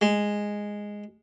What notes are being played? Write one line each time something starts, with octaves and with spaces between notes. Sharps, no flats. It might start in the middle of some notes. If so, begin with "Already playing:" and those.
G#3